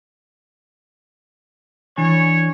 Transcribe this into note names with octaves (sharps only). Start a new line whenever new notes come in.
E3 D4 C#5 G#5